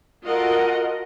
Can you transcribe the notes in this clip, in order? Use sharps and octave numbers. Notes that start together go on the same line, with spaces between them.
F4 F#4 A4 A#4 D#5 F#5